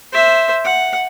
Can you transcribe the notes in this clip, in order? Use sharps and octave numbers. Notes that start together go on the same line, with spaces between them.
C5 E5
F#5